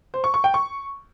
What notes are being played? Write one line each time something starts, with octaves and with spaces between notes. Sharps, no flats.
C5
C#6
C#6
G5
C#6